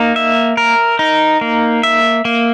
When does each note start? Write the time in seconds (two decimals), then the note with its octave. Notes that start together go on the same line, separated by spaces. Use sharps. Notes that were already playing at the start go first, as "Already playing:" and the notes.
Already playing: A#3 D#4
0.16 E5
0.57 A#4
0.99 D#4
1.41 A#3
1.83 E5
2.25 A#3